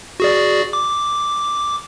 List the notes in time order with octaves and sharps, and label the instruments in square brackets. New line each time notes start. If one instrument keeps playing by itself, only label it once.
[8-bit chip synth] F#4 G#4 D5
D6